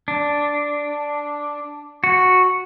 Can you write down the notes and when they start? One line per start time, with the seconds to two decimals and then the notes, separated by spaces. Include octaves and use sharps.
0.08 D4
2.04 F#4